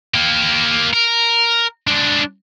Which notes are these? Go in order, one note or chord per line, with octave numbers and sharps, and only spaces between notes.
A#3 G4
A#4
G#3 D4